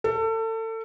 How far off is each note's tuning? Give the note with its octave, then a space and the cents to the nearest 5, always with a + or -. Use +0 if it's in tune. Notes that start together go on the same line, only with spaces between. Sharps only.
A4 +30